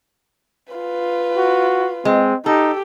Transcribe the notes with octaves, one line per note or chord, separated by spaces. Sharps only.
F4 B4
F#4
G#3 C4
D#4 G4 A4